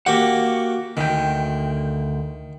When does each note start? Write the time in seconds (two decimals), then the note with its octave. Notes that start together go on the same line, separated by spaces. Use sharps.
0.06 A#3 F#4 G4 F#5
0.97 D2 D#3 G5